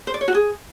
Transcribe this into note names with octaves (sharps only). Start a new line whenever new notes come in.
C5
D5
C#5
F#4
G#4